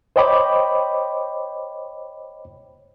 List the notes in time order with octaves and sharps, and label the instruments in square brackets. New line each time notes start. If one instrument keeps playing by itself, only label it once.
[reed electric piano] C5 C#5 D#5 G5 B5 D6